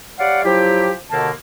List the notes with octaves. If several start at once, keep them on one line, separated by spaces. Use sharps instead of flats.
G3 C#5 D5 F5 F#5
F3 F#3 E4 G4
D#2 B2 D3 A#3 A5